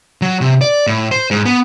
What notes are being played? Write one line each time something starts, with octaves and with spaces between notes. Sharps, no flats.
F#3
C3
D5
A2
C5
G#2
B3